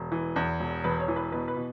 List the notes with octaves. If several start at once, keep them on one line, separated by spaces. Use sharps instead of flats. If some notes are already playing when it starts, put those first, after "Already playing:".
Already playing: E1
E3
E2
E1
E1 B4
C#5
E3
B4
B2 B4
B4
B2